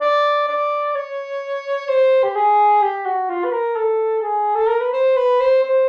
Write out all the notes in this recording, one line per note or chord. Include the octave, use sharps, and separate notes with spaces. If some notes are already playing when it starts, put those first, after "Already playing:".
D5
D5
C#5
C5
G4
G#4
G4
F#4
F4
B4
A#4
A4
G#4
A4
A#4
B4
C5
B4
C5
C5